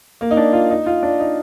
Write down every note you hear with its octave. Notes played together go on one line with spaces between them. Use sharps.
A#3
D#4
D4
F4
D#4
F4
D4
D#4